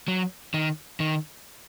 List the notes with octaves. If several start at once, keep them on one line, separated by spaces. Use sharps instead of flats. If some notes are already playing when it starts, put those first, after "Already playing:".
F#3
D#3
D#3